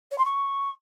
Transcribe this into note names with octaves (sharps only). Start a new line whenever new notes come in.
C#5
C6
C#6